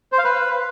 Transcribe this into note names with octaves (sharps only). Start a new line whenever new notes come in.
C5
F5
B4